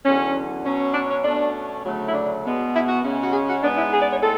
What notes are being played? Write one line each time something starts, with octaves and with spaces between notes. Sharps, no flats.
E2 D3 F#3 C#4
B2 F#3 C#4
D4
C#4
B2 A3 C#4 D4
D2 C#3 F#3 A3
E4
D4
B2 G#3 B3
E4
F#4
C#3 G#3 C#4
F#4
G#4
F#4
G#2 G#3 B3 D4
E4
G#4
D5
C#5
A2 G#3 A4